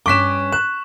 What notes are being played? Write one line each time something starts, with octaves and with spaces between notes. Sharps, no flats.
G2 C#4 C#6 D6 F#6 B6 E7
F#6 E7